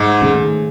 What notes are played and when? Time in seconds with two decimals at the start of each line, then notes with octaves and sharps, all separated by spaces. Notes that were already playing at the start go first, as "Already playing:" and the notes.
Already playing: G#2
0.21 D#3 A3 C#4 G#4